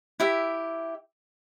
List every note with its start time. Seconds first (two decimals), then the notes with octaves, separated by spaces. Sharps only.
0.20 E4 G4 E5